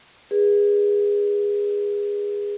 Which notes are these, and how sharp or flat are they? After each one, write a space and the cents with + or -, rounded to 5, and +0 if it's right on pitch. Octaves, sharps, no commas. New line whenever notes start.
G#4 -25 B4 -20